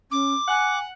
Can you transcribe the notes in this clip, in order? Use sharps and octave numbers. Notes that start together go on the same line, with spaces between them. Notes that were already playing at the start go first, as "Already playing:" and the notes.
C#4 D6
F#5 G#5